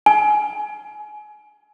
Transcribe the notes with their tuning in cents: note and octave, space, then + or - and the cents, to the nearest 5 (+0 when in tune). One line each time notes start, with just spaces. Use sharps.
G#5 +25